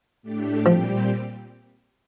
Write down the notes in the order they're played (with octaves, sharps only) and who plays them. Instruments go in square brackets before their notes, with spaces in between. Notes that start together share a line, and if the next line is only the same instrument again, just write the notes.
[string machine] A2 A3 D4 G4
[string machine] A#2 G3 C4 G4 [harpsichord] F3